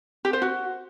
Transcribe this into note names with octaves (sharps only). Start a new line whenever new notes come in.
G4
C5
F#4